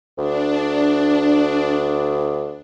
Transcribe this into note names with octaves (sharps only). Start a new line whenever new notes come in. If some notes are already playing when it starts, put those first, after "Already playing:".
D2 D4